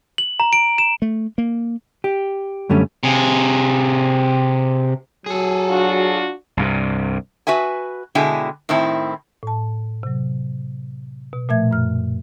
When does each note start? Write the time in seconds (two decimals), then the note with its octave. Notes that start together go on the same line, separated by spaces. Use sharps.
0.18 F#7
0.40 A#5
0.53 D7
0.78 E7
1.02 A3
1.38 A#3
2.04 G4
2.69 F#2 D3 G3 A3 C#4
3.03 C3 G#4
5.26 F#3 G#4 A4
5.68 D4 F4 F#4
6.57 C2 G2 C3
7.47 F#4 B4 E5 G#5
8.15 B2 D3 G#3 E4 G5 G#5
8.69 A2 D#3 C4 E4
9.43 A2 A5
10.03 C3 F#3
11.33 B2
11.49 A#2 F3 A3 E5 G#6
11.71 F#2 F6